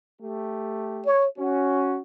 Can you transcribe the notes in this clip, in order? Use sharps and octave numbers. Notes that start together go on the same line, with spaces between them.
A3 G4
C#5
C#4 F#4